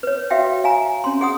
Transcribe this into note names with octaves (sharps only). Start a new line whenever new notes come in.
B4 C#5
F#4 E5 F5 G5
F5 G#5 A#5
C#4 C6
G#4 F#5 D#6